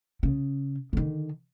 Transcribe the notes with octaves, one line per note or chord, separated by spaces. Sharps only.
C#3
D3 D#3